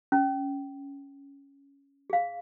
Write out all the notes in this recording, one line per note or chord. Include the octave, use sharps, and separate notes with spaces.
C#4
G#4 F5